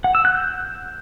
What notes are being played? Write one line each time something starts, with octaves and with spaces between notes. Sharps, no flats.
F#5
E6
F#6
G6